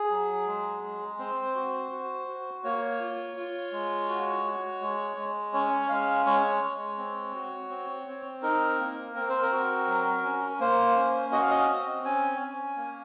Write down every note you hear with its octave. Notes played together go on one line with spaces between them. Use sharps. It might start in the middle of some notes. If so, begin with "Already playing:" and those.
Already playing: G#4
F#3
G#3
G#3
C4 C5
F#4
F#4
F#4
A#3 C#5
F4
F4
G#3
F#4
F#4
G#3
G#3
C#4 C#5
G#3 F5
G#3 C#5
G#3
C4
F#4
C4
C4
D#4 A#4
A#3
C4 A#4
C5
A#4
F#4
F#3
C#4
A#3 C5
C#4
F#4 D#5
F5
D#5
C4
C#4 G#5
C#4
A#3